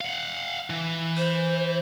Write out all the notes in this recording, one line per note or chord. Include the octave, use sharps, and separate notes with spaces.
F5 F#5
E3
C5